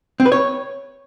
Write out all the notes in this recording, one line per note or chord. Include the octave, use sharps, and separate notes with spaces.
C4
B4
C#5